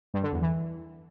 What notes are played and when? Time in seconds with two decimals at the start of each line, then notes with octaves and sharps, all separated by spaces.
0.14 G2
0.23 D3
0.32 E2
0.42 E3